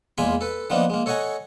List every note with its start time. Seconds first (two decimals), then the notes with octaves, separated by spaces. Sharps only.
0.18 E2 G#3 A#3 F4 G#5 B5
0.41 A4 B4
0.70 D#3 F3 A#3 B3 D4 D#4
0.90 G#3 A#3
1.06 A4 C#5 D#5 F#5 G#5 A#5